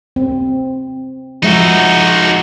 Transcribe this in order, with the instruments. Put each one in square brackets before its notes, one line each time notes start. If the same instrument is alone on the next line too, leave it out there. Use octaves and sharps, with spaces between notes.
[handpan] C4
[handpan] F3 G#3 E5 [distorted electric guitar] D#4 F#4